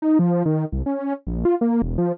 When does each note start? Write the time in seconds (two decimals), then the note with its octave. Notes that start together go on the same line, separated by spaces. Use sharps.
0.02 D#4
0.19 F3
0.45 D#3
0.72 C2
0.86 C#4
1.27 A#1
1.45 F4
1.61 A#3
1.82 E1
1.98 F3